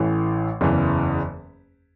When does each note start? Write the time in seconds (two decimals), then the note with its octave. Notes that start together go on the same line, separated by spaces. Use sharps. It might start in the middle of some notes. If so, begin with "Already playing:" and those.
Already playing: A1 A2 E3
0.61 F#1 E2 C#3 E3